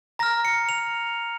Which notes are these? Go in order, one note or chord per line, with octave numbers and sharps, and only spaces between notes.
A#5 F6 A#6
C#7
F7